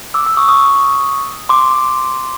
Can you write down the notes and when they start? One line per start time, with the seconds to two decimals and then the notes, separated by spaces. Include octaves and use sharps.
0.14 D6 E6
0.26 D6 E6
0.37 C#6 D#6
0.48 C#6 D#6
1.49 C6 D6